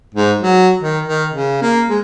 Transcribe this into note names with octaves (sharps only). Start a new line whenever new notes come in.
G#2
F#3
D#3
D#3
C#3
A#3
G#3